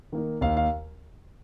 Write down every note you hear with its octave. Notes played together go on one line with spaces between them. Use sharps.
D#3 A#3 D#4
D#2 F5
F5